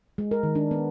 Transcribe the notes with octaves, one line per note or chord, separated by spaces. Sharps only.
G#3
A#4
D#3
D4
B3